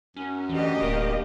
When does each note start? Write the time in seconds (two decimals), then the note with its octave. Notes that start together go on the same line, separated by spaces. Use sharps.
0.16 F#2 C#4
0.49 D2 E3 G4 D#5
0.82 D1 A#3